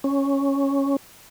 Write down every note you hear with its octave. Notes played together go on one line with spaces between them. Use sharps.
C#4